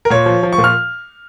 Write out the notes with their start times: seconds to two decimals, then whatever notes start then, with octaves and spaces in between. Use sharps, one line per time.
0.05 A#4
0.10 A#2 C#5
0.26 F3
0.43 F3
0.52 C#6
0.58 A#2
0.64 F6